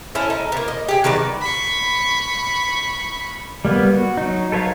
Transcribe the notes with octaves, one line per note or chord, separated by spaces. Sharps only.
C#4 E4 A4
D#4
A#3 B3
D#5
G4 G#4
D#3 F#3 B4 D5
B5 C#6
G3 A#3 B3 B4
F#4
F#3 D#4
A4 B4 C#5 F5 A#5